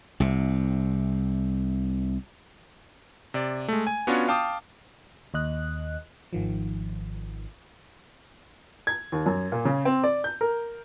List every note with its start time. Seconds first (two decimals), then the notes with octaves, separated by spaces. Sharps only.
0.20 C2 C3
3.34 C3 D5
3.68 G#3 A3
3.87 G#5
4.07 B3 C#4 D4 F4 F#4 C#5
4.28 F5 G5 A5 D6 D#6
5.34 D#2 D#5 F#6
6.33 G#1 D#3 F3
8.87 G#6
9.12 D#2
9.26 F#2
9.52 A#2
9.65 C#3
9.85 C4
10.04 D5
10.24 G6
10.41 A#4